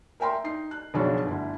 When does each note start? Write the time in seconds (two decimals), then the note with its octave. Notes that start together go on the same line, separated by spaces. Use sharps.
0.20 A#4 E5 G5 A#5 C6
0.44 D#4 C7
0.71 F#6
0.94 B1 C#3 F3 C#4 D4 F#4
1.24 G1 D2 E4